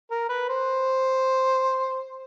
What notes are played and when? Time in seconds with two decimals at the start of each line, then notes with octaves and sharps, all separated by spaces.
0.11 A#4
0.29 B4
0.49 C5